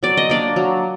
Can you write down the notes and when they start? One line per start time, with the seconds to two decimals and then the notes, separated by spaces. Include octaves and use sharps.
0.03 F#3 D5
0.17 D#5
0.30 A#3 D4 D5
0.56 F#3